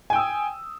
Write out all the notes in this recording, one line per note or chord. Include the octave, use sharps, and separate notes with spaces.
G5 G#5 D#6 E6